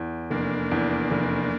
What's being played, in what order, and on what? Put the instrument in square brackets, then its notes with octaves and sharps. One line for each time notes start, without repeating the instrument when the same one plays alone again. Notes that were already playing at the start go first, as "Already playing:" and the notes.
Already playing: [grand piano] E2
[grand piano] F1 [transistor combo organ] A#3 D4
[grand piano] E2
F1